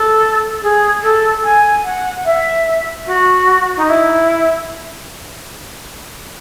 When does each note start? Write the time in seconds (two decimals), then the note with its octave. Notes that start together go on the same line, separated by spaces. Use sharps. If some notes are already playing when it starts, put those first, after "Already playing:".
Already playing: A4
0.62 G#4
1.03 A4
1.44 G#5
1.84 F#5
2.25 E5
3.07 F#4
3.77 D#4
3.89 E4